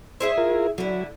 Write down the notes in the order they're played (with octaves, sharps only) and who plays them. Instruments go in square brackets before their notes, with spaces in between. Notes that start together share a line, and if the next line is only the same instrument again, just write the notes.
[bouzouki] E4 G#4 E5 [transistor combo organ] C5
[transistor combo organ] F4 A#4
[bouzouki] D3 E4 [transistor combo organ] F#3